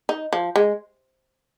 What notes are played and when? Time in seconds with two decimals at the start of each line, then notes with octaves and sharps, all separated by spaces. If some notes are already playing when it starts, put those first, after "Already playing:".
0.09 D#4
0.33 F3
0.56 G#3